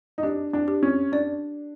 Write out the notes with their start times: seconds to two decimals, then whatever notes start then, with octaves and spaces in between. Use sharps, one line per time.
0.18 D#4
0.23 D4 G4
0.53 D4
0.68 G4
0.83 C#4
1.12 D4 D5